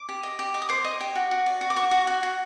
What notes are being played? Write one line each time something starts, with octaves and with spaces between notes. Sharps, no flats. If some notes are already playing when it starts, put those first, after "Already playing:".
Already playing: D6
G4
D#5
G4
D#5 D6
D#6
C5 D6
D#5
G4
F#4
F#4
D5
F#4
D6
F#4 C#6
F#4
F#4
F#4